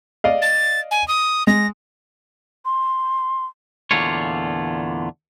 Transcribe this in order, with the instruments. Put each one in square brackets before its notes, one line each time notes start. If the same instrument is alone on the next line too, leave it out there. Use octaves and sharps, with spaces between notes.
[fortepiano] D5 D#5 F5
[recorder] A6
G#5
D#6
[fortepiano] G#3 [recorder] A#6
[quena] C6
[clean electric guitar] E2 A#2 D3 A3 F4 C#5